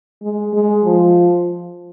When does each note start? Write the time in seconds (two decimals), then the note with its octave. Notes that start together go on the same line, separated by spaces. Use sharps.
0.22 G#3
0.53 G#3
0.84 F3